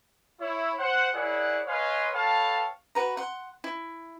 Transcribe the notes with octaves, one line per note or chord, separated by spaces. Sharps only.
E4 C#5
C5 F#5
E4 G#4 A#4 C#5 D5 F#5
B4 C#5 D#5 F5 G#5 C6
A4 B4 C#5 F5 G5 A5
F#4 B4 A#5
F#5 C6
E4